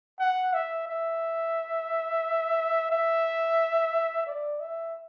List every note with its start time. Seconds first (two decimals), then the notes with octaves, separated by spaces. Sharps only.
0.20 F#5
0.54 E5
0.88 E5
2.91 E5
4.26 D5
4.60 E5